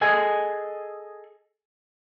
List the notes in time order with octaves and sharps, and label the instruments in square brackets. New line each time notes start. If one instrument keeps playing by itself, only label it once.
[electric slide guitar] G#4 A4 D#5 G#5